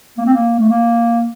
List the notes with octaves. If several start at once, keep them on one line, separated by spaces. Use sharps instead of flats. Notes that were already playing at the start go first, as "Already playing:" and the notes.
A#3
C4
A#3
A3
A#3